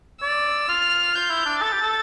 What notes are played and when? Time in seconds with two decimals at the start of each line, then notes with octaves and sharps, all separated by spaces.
0.22 D5 E6
0.69 F4 F6
1.14 F4 G6
1.30 E4
1.46 D4
1.61 A4 A6
1.72 G4
1.82 A4